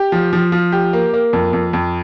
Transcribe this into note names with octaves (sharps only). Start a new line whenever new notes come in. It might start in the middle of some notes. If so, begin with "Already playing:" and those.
Already playing: G4
F3
F3
F3
G4
A#3
A#3
F2
F2
F2